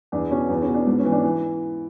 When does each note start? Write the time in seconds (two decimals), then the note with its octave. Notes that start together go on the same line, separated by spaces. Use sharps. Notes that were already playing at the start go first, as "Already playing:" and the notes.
0.12 E2 D4
0.31 B2 C#4
0.50 E2 B3
0.62 C#4
0.68 B2
0.74 D4
0.87 G#2 B3
0.99 C#4
1.05 E3
1.12 D4
1.24 E3